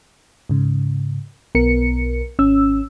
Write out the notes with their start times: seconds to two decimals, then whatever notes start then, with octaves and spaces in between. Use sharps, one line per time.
0.49 G#2 C#3
1.55 B1 B3 A#4 C#7
2.39 G#1 C#4 E6